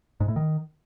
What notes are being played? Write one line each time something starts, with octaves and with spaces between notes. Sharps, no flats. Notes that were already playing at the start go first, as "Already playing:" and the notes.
G#2
A2
D#3